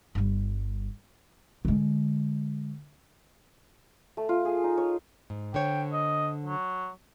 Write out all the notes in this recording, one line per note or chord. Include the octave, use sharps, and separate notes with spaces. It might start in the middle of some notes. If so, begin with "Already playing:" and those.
G1 G3
D3 G#3
A3
F4
G#4
D#4
C#5
G#2
D3 C5 C#5 G5
D#5
F#3